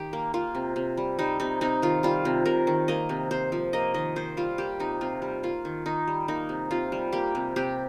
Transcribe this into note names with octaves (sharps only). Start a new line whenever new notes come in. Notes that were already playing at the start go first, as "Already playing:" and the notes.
Already playing: D#3 G4
A#3
A#3 F4
C3
C3
G3
G3 D#4
C3 D#4
C3 D#4
D#3 F4
G3 F4
C3
C3 A#4
D#3
A#3 D#5
C3
C3 C5
F3
A#3 D#5
D#3 D#5
D#3 C5
G3 F4
A#3 G4
C3 D#4
C3 F4
G3
A#3 F4
D#3
D#3 D#4
G3
A#3 D#4
C3
C3 F4
G3
A#3 G4
C3
C3 G4